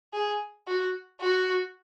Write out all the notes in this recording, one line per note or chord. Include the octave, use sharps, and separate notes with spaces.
G#4
F#4
F#4